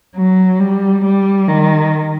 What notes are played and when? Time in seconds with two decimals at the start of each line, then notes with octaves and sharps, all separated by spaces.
0.16 F#3
0.60 G3
1.04 G3
1.48 D#3